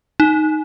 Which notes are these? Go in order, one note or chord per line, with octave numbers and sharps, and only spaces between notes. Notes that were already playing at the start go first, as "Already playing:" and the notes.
D#4